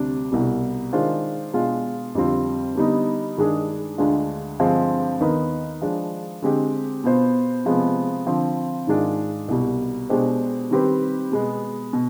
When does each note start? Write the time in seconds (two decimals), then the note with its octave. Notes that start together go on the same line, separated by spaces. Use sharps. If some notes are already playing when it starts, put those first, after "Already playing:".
Already playing: D2 C3 G3 D4
0.31 C2 B2 G3
0.93 D#3 G#3 D4 F4 C5
1.53 B2 G#3 D4 F4
2.15 F2 D3 G3 C4 F4
2.76 D3 G3 B3 D#4
3.37 G2 D#3 G#3 D4 G#4
3.98 D2 D3 G#3 D4 F4
4.59 G2 D3 F3 G#3 C4
5.20 D#2 D#3 B3 D#4 B4
5.82 F3 G#3 D4
6.42 D3 G#3 C4 G4
7.04 B2 B3 F4 C5
7.65 C3 F3 G#3 B3
8.26 D3 F3 C4
8.87 G#2 D#3 G#3 D4 F4
9.48 C2 B2 G3
10.09 B2 G#3 D4 G4 C5
10.71 D#3 G3 C4 G4 B4
11.32 B2 G#3 B3
11.93 B2